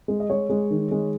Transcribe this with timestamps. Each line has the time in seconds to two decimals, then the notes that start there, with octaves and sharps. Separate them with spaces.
0.08 G#3
0.20 D#5
0.30 G#3 C#5
0.50 G#3
0.70 D#3
0.91 G#3